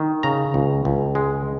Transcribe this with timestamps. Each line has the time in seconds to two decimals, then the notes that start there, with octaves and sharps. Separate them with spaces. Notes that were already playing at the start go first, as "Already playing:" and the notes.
Already playing: D#3
0.23 C#3 A#5
0.54 C#2
0.85 C#2
1.15 G#3